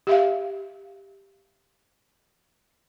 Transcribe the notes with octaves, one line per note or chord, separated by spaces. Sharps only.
G4 E5 F5